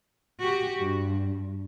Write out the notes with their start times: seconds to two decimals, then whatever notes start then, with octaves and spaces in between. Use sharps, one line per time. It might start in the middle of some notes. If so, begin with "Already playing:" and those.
0.40 F#4 G4
0.79 G2